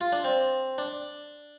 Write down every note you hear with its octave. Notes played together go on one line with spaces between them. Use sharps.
F4
D4
C4
D4